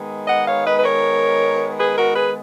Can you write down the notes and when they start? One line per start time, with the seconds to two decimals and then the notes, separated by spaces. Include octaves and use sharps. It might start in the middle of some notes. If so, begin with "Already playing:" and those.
Already playing: D#3 G#3 B3
0.26 D#5 F#5
0.45 C#5 F5
0.64 B4 D#5
0.78 B4
0.83 A#4 C#5
1.77 G#4 B4
1.95 F#4 A#4
2.14 G#4 B4